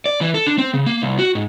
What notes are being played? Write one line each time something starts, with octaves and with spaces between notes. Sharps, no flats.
D5
E3
A4
D4
C4
C#3
A#3
C2
F#4
G#2